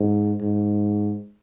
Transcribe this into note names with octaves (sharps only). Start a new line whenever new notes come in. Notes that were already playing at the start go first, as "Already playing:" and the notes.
Already playing: G#2
G#2